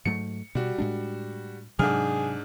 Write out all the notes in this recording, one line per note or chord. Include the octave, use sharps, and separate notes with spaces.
G#2 F#3 A3 C#7
B2 G3 F#4
A2 G#3 D4
G#2 C3 F#3 D4 G#4 F6